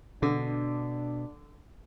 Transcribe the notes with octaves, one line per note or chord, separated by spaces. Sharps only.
B2 D3 D4